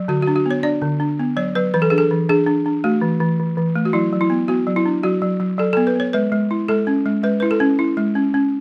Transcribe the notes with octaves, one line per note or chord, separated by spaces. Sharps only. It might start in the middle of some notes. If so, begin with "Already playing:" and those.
Already playing: F#3
D3 F#4
F#4
D4
F#4
B3 C#5
D4 D5
D3
D4
B3
F#3 C#5
F#3 B4
E3 B4
A4
D4 G#4
A4
E3
D4 G#4
D4
D4
A3 F#4
E3
E3
E3
E3
A3
F#4
F#3 E4
F#3
E4
B3
B3 F#4
F#3
E4
D4
F#3 F#4
F#3
F#3
F#3 A4
B3 A4
B4
B3 C#5
G#3 B4
G#3
E4
G#3 A4
C#4
G#3
G#3 B4
E4 B4
A4
C#4
E4
G#3
C#4
C#4